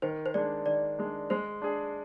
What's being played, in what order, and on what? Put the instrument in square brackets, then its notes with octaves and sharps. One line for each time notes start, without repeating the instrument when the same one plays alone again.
[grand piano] D#3 [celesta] C5
[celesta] C5
[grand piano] G#3 D4 [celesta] D5
[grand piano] D#3 [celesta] D5
[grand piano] G#3 D4
[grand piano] G#3 [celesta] C5
[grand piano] D4 G#4